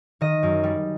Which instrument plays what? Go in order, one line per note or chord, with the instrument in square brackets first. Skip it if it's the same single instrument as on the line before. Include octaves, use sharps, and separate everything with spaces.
[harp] D#3 D#5
F#2
G3